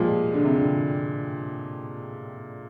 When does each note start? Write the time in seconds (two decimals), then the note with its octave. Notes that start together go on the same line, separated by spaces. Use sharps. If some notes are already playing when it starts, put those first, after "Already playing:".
Already playing: A#2 F3 G3 G#3
0.34 D3
0.44 C3
0.55 D3